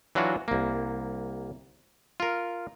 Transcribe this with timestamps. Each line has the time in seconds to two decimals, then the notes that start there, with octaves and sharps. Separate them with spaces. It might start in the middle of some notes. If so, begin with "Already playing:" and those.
0.15 E3 F#3 D4 F4 F#4
0.48 C2 A#3
2.20 F4 A#4